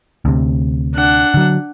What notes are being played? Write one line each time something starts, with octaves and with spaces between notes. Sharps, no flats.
D2 C3
D4 F#5
D3 F#3